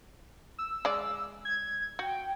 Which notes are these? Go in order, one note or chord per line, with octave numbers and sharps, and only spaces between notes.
E6
G#3 D5
G#6
F#4 G5